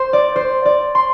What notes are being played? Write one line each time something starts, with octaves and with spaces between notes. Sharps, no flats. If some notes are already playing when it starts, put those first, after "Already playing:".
Already playing: C5
D5
C5
D5
C6